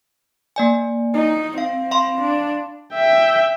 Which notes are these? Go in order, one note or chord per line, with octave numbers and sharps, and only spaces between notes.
A#3 D5 G#5
D#4
C4 F5
F5 B5 C6
D4
E5 G5